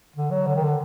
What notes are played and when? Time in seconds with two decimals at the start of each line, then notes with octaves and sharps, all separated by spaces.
0.16 D3
0.31 F#3
0.47 D3
0.56 D#3
0.63 D3